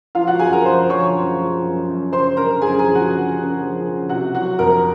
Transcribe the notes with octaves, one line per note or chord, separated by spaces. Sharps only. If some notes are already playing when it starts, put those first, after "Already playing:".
F3 F4 F5
F#4 F#5
F#2 G#4 G#5
A#4 A#5
F3 C5 C6
F3 C#5 C#6
F#2
F3
F#2
F#2
C#3 C5 C6
F#2 A#4 A#5
F#2 G#4 G#5
G#4 G#5
F3
F#4 F#5
C#3
C#3
F3
C#3
C3 F#4 F#5
F#3 F#4 F#5
F2 A#4 A#5